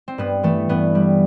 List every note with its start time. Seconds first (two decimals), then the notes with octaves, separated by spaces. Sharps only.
0.08 C4
0.18 G2 B3
0.43 E3 A3
0.69 G2 B3
0.95 G3